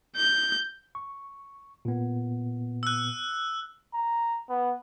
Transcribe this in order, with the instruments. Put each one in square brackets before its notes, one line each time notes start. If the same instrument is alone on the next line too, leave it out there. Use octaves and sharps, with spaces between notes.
[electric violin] G6
[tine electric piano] C#6
A#2 B3
[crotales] E6 F#6
[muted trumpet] A#5
B3